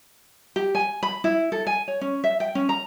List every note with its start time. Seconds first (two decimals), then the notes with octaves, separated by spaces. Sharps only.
0.56 G4
0.75 G#5
1.03 B5
1.24 E4
1.52 A4
1.67 G#5
1.88 C#5
2.01 C#4
2.24 E5
2.40 G5
2.55 C#4
2.69 A#5